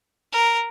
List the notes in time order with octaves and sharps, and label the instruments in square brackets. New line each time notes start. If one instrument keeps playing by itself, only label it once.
[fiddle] A#4